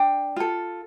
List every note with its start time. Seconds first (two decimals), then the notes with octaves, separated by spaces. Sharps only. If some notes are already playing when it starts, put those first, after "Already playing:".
Already playing: D4 G5
0.36 F4 A4